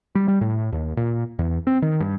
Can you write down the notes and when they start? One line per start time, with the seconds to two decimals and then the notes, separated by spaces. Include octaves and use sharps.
0.15 G3
0.28 G3
0.41 A2
0.72 D#2
0.97 A#2
1.39 E2
1.67 C4
1.82 D#3
2.00 G2